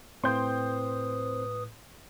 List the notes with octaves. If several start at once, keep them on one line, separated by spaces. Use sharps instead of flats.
A2 C4 B4 C6 D#6 G6